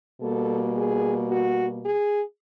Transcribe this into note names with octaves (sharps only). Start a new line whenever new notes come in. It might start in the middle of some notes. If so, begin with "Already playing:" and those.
B2 G3 A#3 A4
G#4
F#4
G#4